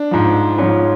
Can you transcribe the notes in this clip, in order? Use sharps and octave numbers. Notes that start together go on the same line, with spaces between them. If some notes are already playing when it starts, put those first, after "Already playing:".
Already playing: D4
G#2 F3
G#2 F3 C#4